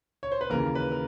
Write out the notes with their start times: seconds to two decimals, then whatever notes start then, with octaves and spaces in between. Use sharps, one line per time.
0.23 C#5
0.32 C5
0.41 B4
0.49 D#2 C#3 E3 A#4
0.75 B4
0.92 A#4